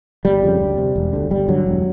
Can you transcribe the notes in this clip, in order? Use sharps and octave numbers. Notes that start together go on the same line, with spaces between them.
G1 G3
F2 C#3
D2
C3
E1
D2 D3
G1 G3
G2 D3 F#3
E1